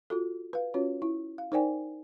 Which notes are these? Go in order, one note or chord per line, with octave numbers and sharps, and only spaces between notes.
F4 F#4 A4
B4 F5
C#4 F4 F#4 C#5
E4
F5
D#4 A#4 C5 D5 G5 G#5